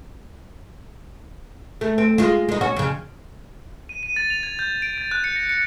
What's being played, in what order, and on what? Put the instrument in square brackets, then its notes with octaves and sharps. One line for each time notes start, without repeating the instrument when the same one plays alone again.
[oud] A3
C4
G#3 F4
G#3 D#4
C#4 F#4
F2 C#3
[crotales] D#7
D#7
A6
F7
G#6
G6
D7
A6
F#6
C#7
A#6
C#7